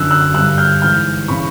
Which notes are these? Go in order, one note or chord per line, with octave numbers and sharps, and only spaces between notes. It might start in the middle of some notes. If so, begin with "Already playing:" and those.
Already playing: F#2 D3 E6 F#6
E6 F#6
G2 D3 E6 F#6
F6 G6
G#2 E3 F6 G6
C#3 E3 B5 C#6